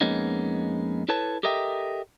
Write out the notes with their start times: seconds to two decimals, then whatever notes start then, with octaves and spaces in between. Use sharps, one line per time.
0.01 F2 G#3 A#3 B3 C#4 D#4
1.08 E4 A4 B4 C#5 A5
1.43 G4 A4 A#4 D#5 E5 G5